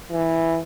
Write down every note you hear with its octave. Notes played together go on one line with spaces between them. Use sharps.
E3